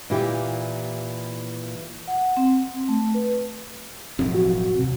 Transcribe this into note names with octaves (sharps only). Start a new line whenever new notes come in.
A#2 E3 E4 G4
F#5
C4
A3
B4
E1 A1 F3 F#3 C4
F#4
D#2 C3